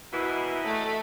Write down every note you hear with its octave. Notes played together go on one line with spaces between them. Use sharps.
B2 E3 E4 A#4 D#5
A3